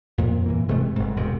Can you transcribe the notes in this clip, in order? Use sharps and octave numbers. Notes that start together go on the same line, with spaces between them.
F2 A#2 A#3
G2 E3 A#3
E1 C3 G#3 A3
G1 G#2
E1 E2 C3 G#3